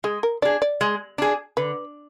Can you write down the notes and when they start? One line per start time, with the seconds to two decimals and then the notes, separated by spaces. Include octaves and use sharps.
0.04 G#3 G#4
0.23 A#4
0.42 D4 G#4 D5
0.62 D5
0.81 G#3
1.18 D4 G#4
1.57 D3 B4